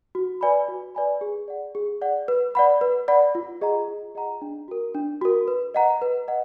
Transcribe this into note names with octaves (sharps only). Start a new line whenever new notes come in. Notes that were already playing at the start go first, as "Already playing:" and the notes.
F#4
B4 D5 G#5 B5
F#4
B4 D5 G#5 B5
G#4
D5 F#5
G#4
D5 F#5
B4
D5 F#5 B5
B4
D5 F#5 B5
F4
G#4 D#5 F#5 A#5
F4
G#4 D#5 F#5 A#5
D4
F#4 A#4
D4
F#4 A#4
B4
D#5 F#5 A#5
B4
D#5 F#5